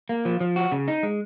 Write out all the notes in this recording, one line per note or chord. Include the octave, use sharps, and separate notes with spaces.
A#3
F3
F3
F#4
C#3
D#4
G#3